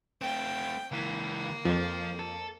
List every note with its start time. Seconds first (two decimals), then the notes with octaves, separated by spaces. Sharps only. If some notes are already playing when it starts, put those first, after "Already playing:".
0.21 A3 C4 G5
0.92 C#2 E3 A#3
1.65 F2 F3
2.19 A4